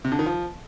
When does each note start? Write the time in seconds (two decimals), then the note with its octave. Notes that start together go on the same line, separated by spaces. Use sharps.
0.05 C3
0.12 D3
0.19 D#3
0.26 F3